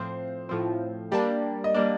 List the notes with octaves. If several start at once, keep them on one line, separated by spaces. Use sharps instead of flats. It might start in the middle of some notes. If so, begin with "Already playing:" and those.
Already playing: A2 F3 C4 C5
A2 F3 C4
G3 A#3 D4 D5
D#5
G3 A#3 D4 D5